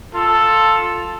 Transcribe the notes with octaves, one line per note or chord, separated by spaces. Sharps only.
F4 A4